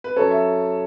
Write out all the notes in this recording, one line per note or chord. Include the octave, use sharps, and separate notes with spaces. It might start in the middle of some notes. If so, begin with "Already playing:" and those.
B4
F#2 A4 C#5
E5